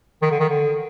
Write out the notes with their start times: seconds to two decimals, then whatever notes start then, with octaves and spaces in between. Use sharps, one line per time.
0.22 D#3
0.31 D3
0.40 D#3
0.49 D3